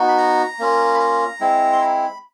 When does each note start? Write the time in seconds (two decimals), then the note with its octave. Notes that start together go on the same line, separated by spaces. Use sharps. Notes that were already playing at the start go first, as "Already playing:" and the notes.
Already playing: B3 D#4 F#4
0.08 B5
0.18 A#5
0.59 A#3 C#4 F4
0.94 B5
1.00 A#5
1.41 G#3 C4 E4
1.73 C6
1.82 B5